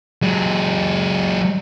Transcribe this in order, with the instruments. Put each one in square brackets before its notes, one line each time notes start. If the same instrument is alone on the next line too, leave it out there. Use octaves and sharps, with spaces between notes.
[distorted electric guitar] F#3 G#3